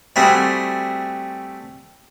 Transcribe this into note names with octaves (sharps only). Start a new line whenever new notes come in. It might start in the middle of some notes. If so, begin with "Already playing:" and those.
G3 A3 C4 E4 F#4 G#4